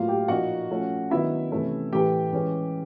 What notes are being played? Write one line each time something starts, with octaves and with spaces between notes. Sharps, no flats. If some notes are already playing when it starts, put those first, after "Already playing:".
Already playing: A2 F#3 A#3 F4 F5
G4 G5
A#2 F3 A#3 D#4 F#4 F#5
F3 A3 C#4
D#3 F#3 B3 D4 E4 E5
C3 E3 A3 C#4
A2 E3 A3 G4 G5
E3 G#3 C#4